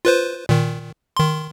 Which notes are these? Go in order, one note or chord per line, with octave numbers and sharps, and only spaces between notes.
F4 B4 C5
A#2 D#3
D#3 C6